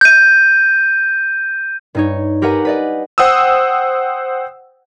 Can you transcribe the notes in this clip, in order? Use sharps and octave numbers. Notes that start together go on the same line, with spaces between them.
G6 D#7
G2 D#4 C#5
G4 A#4 B4 F#5 G#5 A#5
B4 D5 D#5
C5 F#5 G5 D#6 E6